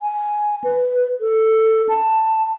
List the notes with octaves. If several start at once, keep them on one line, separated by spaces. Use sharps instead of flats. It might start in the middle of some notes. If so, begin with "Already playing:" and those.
G#5
B4
A4
A5